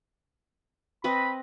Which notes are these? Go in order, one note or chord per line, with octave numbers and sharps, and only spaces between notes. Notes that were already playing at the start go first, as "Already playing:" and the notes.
C4 B4 D#5 B5